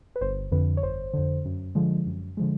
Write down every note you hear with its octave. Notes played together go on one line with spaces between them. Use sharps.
B4
G1 C5
F2 D3 B4
C#5
G1 C5
F2 D3
F#2
D3 F3 G#3
F#2
D3 F3 G#3